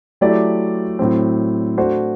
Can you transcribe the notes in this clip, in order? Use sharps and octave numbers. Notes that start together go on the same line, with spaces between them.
F#3 A3 E4 G4 D5
A2 F#3 C4
A3 D4 F#4 C5